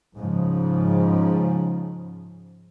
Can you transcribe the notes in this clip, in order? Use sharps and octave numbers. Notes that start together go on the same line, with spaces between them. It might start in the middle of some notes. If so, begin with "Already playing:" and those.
G#2 C#3 F3